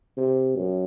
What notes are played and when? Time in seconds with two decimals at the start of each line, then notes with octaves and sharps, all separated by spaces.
0.17 C3
0.56 F#2